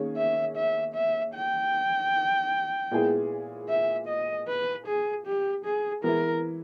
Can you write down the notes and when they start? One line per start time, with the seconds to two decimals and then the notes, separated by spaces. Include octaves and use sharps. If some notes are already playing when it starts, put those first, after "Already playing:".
Already playing: D#3 A#3 C#4 G#4 C#5
0.17 E5
0.56 E5
0.95 E5
1.34 G5
2.91 A#2 G#3 B3 E4 G#4
3.69 E5
4.08 D#5
4.48 B4
4.86 G#4
5.26 G4
5.65 G#4
6.04 E3 G#3 B3 E4 A#4